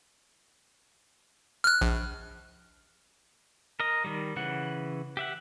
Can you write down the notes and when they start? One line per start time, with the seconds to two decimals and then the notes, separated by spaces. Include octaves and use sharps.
1.64 F6 F#6
1.81 A#1
3.80 A#4 D#5
4.04 D#3 G3
4.36 C#3 E3 F#5
5.17 G4 E5 F#5